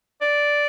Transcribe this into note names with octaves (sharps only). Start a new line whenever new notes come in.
D5